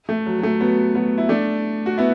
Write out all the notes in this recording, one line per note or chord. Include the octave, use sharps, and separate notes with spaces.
A3
F#3
F#3
A3
F#3 B3
F#3 B3
E4
A3 D4
F#4
B3 E4